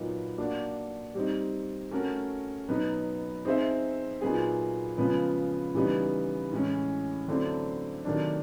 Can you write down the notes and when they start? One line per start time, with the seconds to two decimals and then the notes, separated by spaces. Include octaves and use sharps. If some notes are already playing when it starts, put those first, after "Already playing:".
Already playing: A#2 F#3 B3 D#4
0.38 A#3 D4 F#4
1.15 G3 C4 D#4
1.91 A3 C#4 F#4 A#4
2.68 B2 F#3 B3 D#4
3.45 C4 D#4 G#4 C5 E5
4.21 A#2 F#3 B3 D#4 G#4
4.98 C#3 F3 G#3 B3
5.75 C#3 E3 G3 B3 D#4
6.52 A2 E3 G#3 C#4
7.28 D3 F#3 A3 C4 E4
8.05 C3 D#3 F#3 A3 D4